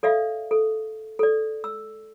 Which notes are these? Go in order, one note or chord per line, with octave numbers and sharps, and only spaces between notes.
A4 D5 E5 F5
A4
A4 D5
E6